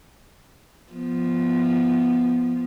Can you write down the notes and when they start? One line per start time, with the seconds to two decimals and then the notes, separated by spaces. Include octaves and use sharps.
0.93 F3 B3